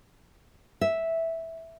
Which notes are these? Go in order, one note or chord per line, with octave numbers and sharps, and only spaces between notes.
E5